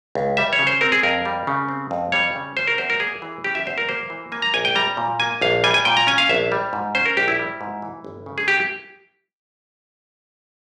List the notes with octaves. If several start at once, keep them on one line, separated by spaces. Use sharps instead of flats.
C#2
G3 E5
C#5
C#3
C5
C4 A#4
G#4
F2 A#4
G3
C#3
C4
F2
G3 C#5
C#3
C#4 C5
A#4
E2 C5
A#4
A#3 G#4
E3
C#4 G4
E5
E2 C5
A#4
A#3 C5
E3
A#3 G#5
A#5
A#1 G#5
G5
G3 A#5
A#2
A#3 G#5
A#1 F5
G3 G#5
G#5
A#2 G5
A#5
C#4 G#5
F5
A#1 E5
G3
G#2
C#4 C5
A#4
A#1 G4
E4
G3
G#2
E3
G1
C#3
G#4
G4